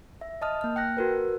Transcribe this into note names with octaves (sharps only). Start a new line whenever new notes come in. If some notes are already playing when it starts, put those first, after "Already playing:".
E5
D#5 A5 D#6 F6
A#3 F6
G5 F#6 A#6
F#4 A#4 B4